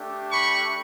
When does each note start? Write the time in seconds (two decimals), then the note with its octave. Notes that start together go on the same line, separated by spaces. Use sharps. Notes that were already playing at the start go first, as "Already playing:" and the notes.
Already playing: A3 D4 G4
0.31 B5 C#6